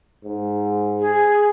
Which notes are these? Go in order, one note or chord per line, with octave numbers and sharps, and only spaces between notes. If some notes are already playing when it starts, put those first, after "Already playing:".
G#2
G#4